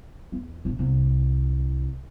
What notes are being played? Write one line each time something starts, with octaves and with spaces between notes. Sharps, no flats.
E2
A#1
C2